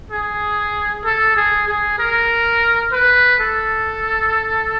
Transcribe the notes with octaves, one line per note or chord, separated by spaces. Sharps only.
G#4
A4
G#4
G#4
A#4
B4
A4